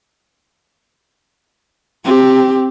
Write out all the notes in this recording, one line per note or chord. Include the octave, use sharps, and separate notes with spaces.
C4 G4